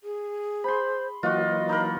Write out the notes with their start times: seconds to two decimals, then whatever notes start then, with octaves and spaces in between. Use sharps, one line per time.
0.03 G#4
0.64 C5 B5 C6
1.23 E3 F#3 A#3 F4 F#4 D#5
1.69 D#4 A#4 B5